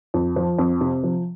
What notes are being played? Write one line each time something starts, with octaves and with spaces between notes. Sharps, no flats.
F2
F3
F2
C3
F3